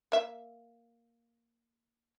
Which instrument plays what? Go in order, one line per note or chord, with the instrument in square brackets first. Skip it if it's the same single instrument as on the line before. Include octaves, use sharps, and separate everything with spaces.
[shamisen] A#3 E5